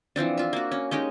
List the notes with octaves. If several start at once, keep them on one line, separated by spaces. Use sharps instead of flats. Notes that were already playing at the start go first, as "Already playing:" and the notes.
E3 F3 C4 D4
F4 E5
A#3 F#4
C#4
G#3 C#4 D#4 G4